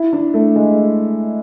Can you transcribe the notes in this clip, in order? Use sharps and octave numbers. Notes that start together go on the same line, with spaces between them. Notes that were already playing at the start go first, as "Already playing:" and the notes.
Already playing: E4
D4
A3
G#3